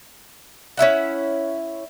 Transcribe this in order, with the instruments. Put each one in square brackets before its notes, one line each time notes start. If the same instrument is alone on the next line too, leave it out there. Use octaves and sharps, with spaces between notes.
[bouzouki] C#4 E4 E5 F#5